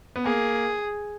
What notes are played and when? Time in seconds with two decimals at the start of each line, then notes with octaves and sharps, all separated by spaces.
0.16 B3
0.26 A#3 G#4